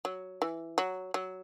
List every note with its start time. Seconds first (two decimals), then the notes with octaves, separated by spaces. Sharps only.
0.05 F#3
0.42 E3
0.78 F#3
1.14 F#3